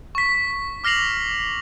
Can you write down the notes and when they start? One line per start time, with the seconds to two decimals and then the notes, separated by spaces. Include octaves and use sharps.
0.15 C#6 B6
0.84 D6 F6 A#6 C7 F7 F#7